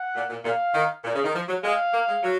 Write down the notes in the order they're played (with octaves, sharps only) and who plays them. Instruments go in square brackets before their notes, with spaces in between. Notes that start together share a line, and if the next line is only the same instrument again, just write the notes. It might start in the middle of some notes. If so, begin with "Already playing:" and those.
Already playing: [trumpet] F#5
[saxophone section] A#2
A#2
[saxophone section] A#2 [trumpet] F5
[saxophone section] D#3
A#2
C#3
D#3
F3
F#3
[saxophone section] G#3 [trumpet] F5
[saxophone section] A#3
G#3
F#3